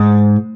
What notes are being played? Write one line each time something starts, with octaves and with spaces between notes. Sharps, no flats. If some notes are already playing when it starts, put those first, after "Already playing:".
Already playing: G#2